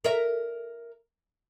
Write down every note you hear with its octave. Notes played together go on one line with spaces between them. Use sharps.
A#4 E5